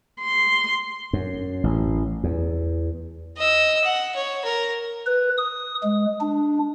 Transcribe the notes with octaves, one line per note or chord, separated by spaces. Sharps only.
C6
F#2
A1
E2
D#5 E6
F#5
C#5
A#4
B4
D#6
G#3
D4